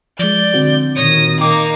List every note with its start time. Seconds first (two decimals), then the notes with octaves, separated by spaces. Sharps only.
0.19 F3 G#3 D5 G6
0.54 D3 C4 F#4
0.96 A#2 D#3 C#5 D#6 A#6
1.41 A#3 D#4 G5 D6